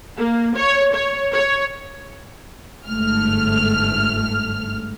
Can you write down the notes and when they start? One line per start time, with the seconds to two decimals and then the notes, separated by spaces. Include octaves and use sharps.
0.17 A#3
0.56 C#5
0.94 C#5
1.33 C#5
2.87 G1 G#2 A3 F6